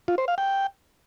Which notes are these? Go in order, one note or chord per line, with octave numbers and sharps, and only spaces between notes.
F4
C5
F5
G5